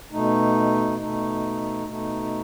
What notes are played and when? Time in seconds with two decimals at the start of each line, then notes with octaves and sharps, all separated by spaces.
0.12 B2 A3 D#4
0.99 B2 A3 D#4
1.86 B2 A3 D#4